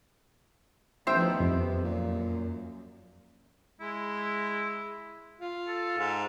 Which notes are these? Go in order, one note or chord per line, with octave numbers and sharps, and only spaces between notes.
A1 D#3 F3 B3 C5 E5 G5
F2 C3
F#2 A#2
G#3 E4
F4
A4
G#2